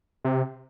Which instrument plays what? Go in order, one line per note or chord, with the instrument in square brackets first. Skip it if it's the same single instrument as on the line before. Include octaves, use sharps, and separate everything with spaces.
[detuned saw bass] C3